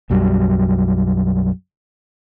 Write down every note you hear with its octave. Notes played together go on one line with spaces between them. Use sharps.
B1 F#2 F#3 G3